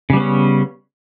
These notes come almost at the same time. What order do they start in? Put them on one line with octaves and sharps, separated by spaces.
C#3 G3 B3 C#4